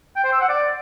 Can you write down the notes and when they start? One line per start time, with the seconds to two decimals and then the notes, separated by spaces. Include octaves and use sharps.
0.16 G5
0.24 C5
0.33 E6
0.41 F#5
0.49 D5